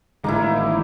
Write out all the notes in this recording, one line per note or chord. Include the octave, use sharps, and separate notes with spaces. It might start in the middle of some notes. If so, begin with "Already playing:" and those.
A1 D#3 G#3 A#3 D#4 E4